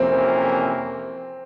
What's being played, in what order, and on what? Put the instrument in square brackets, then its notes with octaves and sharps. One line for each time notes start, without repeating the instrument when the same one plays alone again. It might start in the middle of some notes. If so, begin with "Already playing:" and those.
Already playing: [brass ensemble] F2 C3 E3 A#3 C#4 [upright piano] C4